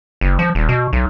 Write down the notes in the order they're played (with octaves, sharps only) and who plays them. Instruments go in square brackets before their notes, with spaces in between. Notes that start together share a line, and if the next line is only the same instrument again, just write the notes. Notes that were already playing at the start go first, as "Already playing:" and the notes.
[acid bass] F#1
F3
D#1
B2
B1